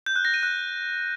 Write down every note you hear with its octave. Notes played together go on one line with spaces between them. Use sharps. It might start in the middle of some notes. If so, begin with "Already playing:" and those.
G6
F#6
A#6
D#7
F#6